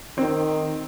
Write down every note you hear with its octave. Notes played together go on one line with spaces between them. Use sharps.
D#3 C4